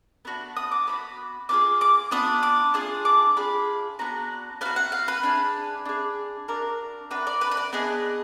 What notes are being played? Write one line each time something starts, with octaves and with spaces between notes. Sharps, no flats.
B3 D4 F#4
D#6
D6
B3 D4 F#4 B5
B3 D4 F4 G#4 D6
D6
B3 D4 F4 D#6
D6
D4 F4 G#4 D#6
D6
D4 F4 G#4 B5
B3 D4 F#4 A#5
B3 D4 F#4 F5
F#5
F5
B4
D4 G#4
D4 G#4
D4 F#4 A#4
D4 F#4 B4
D5
B4
B4
D5
B3 D4 G#4 D#5